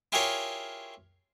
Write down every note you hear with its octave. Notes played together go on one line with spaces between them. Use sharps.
E4 F4 G4 G#4 A#4 C#5